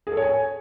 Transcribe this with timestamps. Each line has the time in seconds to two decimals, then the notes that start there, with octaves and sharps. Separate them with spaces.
0.07 G#4
0.12 A4
0.17 C#5
0.22 G#5